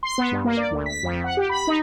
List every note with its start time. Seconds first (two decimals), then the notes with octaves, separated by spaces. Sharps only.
0.03 C6
0.18 B3
0.32 G2
0.45 A#3
0.57 D5
0.71 D2
0.86 B6
1.03 F2
1.24 F#5
1.37 G4
1.49 B5
1.67 D#4